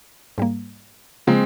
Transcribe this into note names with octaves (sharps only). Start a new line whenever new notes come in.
G#2 G3 A#3
C#3 F3 G#3 A#3 C4 F4